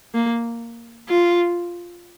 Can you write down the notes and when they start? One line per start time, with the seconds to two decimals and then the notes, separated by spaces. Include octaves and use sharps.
0.14 A#3
1.09 F4